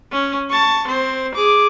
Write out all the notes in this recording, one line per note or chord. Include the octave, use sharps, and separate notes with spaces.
C#4
A5 C#6
C4 C5
G#4 D6